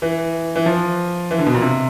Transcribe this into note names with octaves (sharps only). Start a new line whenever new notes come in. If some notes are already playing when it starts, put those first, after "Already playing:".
E3
E3
F3
E3
D3
B2
A#2
C3